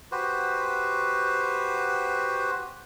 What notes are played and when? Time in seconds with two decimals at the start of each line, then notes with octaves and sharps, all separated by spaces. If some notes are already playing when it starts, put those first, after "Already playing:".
0.12 F#4 G4 B4 C5